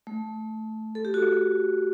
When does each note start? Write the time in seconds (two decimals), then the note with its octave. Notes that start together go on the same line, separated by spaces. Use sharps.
0.07 A3
0.95 A4
1.05 G4
1.14 F#4